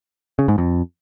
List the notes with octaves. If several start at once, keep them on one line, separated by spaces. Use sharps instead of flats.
C#3
G#2
F2